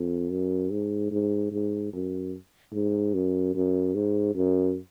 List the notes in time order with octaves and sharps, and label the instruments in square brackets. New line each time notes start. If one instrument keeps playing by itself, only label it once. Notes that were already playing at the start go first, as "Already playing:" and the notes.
Already playing: [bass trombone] F2
F#2
G#2
G#2
G#2
F#2
G#2
F#2
F#2
G#2
F#2